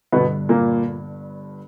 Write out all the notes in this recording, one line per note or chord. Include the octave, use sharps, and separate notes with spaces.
G1 G2 B2 D3 B3
A#2 A#3